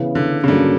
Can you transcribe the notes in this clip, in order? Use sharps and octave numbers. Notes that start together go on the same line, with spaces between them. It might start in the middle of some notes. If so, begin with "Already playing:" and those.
Already playing: C#3 E3 B3
D3
C#3
G2 D3 F#3 A#3